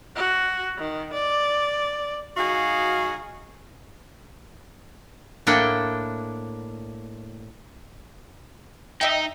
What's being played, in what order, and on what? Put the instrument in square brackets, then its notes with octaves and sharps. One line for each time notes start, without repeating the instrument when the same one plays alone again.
[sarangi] F#4
D#3
D5
[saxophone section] F#3 D#4 F#4 G#4 F5
[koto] A2 A#3 D4 E4 F#5 G5
[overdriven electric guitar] D#4 [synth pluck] D#5 E5 G5